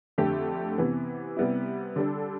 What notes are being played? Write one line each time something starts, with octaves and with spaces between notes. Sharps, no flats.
F2 D3 A3 G4
C3 E3 B3
C3 G3 B3 E4
D3 G3 D4 A4